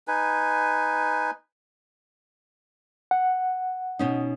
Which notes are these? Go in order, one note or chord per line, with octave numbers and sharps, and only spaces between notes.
D#4 B4 G#5
F#5
B2 C#4 D#4